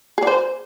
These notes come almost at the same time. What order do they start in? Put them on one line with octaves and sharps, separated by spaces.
G#4 D5 C5